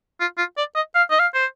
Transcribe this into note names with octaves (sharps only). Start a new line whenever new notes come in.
F4
F4
D5
D#5
F5
D#5
F5
C5